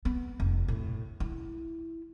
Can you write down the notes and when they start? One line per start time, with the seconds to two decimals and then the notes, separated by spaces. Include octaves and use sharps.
0.05 B3
0.40 F1
0.68 A2
1.20 E4